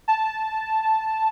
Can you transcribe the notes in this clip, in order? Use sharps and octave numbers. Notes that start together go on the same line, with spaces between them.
A5